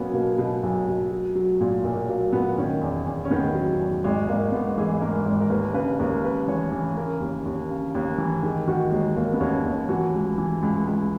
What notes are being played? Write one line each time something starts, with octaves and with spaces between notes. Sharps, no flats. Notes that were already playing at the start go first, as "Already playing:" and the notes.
Already playing: B1 F#3 A#3 B3 C#4
B2 A#3
B2
B1
B2
F#3
F#3
A#2
B1 A#3
F#3 A#3
A#2 B3
D#3 C#4
E2
E2
C#4
D#3 B3
F#3
E2
G#1 G#3
G#1 A#3
G#2 B3
E3 G#4
G#2 A#4
G#1
A#4
D#2 B4
C#3 B4
D#2 A#4
C#3 B4
E3 C#5
E3
C#3 A#4
D#2
D#2
C#3
D#2
E3
D#3 G#4
D#3 F#4
D#2 G#3
D#2 A#3
B3
D#2 C#4
D#2
E3 F#4
C#2
E3
C#2
C#2